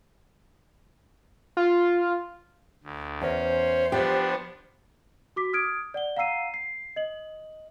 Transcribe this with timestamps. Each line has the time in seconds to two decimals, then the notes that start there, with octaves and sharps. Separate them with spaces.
1.57 F4
2.84 D2
3.22 E2 C#4 A#4 C5
3.92 F3 B3 D4 G4
5.36 F#4 D6 B6
5.53 D#6 F6 G#6 D7
5.94 D5 F#5 G7
6.17 F5 F#5 A#5 E6 C7 D#7
6.54 C7
6.96 D#5 F#7